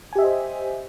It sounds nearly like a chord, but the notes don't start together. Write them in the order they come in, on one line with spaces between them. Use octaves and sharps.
G#5 G4 E5 D#5 C5